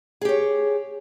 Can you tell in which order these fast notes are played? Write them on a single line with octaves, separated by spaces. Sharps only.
G#4 G4 C#5